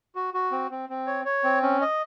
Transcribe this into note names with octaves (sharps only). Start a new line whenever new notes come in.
F#4
F#4
C4
C4
C4
C#5
C#5
C4
C#4
D#5